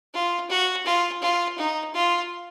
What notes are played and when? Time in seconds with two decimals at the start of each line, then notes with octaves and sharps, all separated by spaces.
0.14 F4
0.50 F#4
0.86 F4
1.22 F4
1.58 D#4
1.94 F4